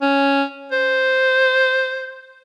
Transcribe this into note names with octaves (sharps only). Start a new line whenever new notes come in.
C#4
C5